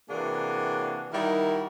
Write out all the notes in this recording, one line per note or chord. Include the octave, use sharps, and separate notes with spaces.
C3 E3 A#3 D4 F#4 G#4
D#3 G3 D#4 E4 F#4 A#4